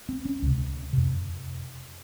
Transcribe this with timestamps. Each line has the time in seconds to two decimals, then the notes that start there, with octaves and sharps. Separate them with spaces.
0.09 C4
0.25 C#4
0.42 C#2 C3
0.93 F2 C3